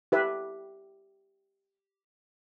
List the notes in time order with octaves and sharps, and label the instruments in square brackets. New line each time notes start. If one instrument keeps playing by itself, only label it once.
[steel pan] G4 B4 E5